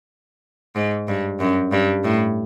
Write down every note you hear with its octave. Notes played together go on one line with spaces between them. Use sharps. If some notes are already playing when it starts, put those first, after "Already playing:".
G#2
G2
F#2
G2
A2